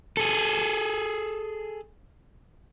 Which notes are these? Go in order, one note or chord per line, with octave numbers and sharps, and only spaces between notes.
G#4 A4